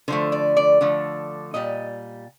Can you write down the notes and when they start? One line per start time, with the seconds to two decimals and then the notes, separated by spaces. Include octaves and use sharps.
0.08 D3 F3 A3 C5
0.32 D5
0.57 D5
0.81 D3 F3 A3
1.54 A#2 G3 D#5